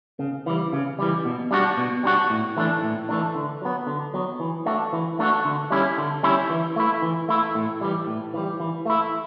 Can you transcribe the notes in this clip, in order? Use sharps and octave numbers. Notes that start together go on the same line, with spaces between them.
C#3
E3 G3
C#3
E3 G3
B2
G3 D4 F#4
B2
G3 D4 F#4
A2
E3 A3 D4
A2
E3 A3 D4
D3
F#3 B3
D3
F#3 B3
E3
A3 D4 F#4
E3
A3 D4 F#4
D3
G3 C#4 E4
D3
G3 C#4 E4
E3
A3 E4
E3
A3 E4
A2
E3 G3
A2
E3 G3
E3
A3 E4